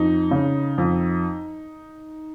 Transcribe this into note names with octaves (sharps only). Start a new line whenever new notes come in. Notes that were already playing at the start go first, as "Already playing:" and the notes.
Already playing: F2 D#4
C#3
F2